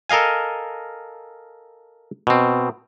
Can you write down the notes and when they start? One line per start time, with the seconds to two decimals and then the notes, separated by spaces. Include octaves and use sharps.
0.09 A4 A#4 D#5 F5 G#5
2.27 B2 C4